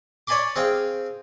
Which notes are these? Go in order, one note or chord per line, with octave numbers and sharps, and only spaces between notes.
C#5 D5 G#5 B5 C6 D6
C4 G#4 F5 G5